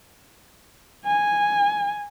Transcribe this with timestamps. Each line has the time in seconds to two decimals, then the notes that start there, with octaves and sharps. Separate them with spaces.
1.06 G#5